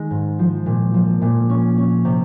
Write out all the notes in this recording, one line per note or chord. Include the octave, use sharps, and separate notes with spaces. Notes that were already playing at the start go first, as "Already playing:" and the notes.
Already playing: D#3 G#3
G#2
F3
A#2
F3
A#2
C#4
C#4
C3